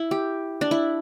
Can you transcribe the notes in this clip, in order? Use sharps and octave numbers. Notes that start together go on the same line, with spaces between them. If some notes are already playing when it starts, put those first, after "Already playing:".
Already playing: E4
G4
D4
E4